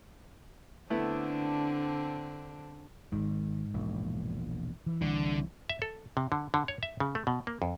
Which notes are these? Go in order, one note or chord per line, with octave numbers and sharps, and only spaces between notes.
D3 A3 B3 C4 D4 E4
G#1 G#2 D#3
E1 A#1
E3
C2 D3
E5
A4
C3
D3
D3
C#5
E5
C#3
A3
B2
A#3
F2